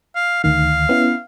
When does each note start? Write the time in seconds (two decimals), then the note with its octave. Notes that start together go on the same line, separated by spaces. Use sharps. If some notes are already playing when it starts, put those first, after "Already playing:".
0.16 F5
0.44 D2 D#3 F5
0.89 B3 C#4 E4